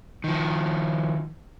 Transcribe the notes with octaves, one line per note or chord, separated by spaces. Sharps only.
D#3 F3